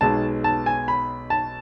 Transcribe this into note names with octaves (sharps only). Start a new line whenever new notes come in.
B1 B2 G#3 A5
A5
G#5
B5
A5